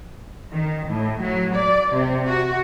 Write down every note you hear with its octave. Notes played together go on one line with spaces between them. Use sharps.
D#3
A2
F#3
D5
C3
F#4